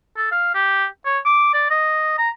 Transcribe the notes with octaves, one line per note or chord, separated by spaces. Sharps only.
A4
F5
G4
C#5
D6
D5
D#5
A#5